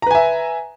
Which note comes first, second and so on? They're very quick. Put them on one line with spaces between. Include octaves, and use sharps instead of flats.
A#5 B4 G#5 E5